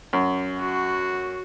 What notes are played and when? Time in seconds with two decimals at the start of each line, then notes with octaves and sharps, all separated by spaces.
0.13 F#2
0.59 F#4